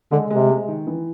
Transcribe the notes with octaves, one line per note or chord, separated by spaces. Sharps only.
D3 G#3
C3 G#3
G#3
D#3
E3